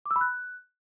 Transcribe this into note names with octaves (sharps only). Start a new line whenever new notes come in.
D6
E6
B5
F#6